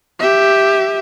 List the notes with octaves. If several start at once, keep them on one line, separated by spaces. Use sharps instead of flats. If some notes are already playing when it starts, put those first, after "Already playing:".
G4 E5